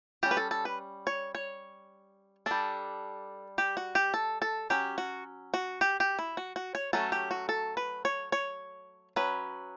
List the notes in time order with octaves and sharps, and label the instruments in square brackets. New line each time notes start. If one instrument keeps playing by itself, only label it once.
[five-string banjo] G3 C#4 G4
B4
A4
A4
B4
C#5
C#5
G3 D4 A4
G4
F#4
G4
A4
A4
F#3 C#4 G4
F#4
F#4
G4
G4
E4
F#4
F#4
C#5
F#3 A3 C#4 A4
G4
F#4
A4
B4
C#5
C#5
F#3 C#4 B4